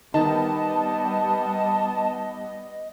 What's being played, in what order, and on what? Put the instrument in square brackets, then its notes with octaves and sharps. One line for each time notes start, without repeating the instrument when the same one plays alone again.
[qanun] D#3 [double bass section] G3 B3 [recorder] D#5 [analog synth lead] A5